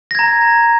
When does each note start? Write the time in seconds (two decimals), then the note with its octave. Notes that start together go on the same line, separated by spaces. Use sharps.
0.11 A#6
0.15 G#6
0.19 A#5